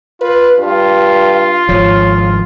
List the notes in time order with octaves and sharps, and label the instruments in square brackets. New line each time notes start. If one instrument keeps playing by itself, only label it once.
[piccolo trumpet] F4 [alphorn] B4
[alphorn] G2 [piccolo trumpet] F4
[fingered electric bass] G#1 F3 [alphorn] C#5